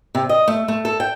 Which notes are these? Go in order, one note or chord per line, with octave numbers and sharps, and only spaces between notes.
C3
D#5
A3
A3
A4
G5